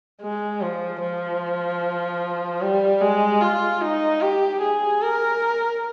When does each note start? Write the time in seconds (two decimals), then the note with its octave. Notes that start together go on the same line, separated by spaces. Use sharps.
0.22 G#3
0.62 F3
1.02 F3
2.62 G3
3.01 G#3
3.41 F4
3.81 D#4
4.21 G4
4.62 G#4
5.02 A#4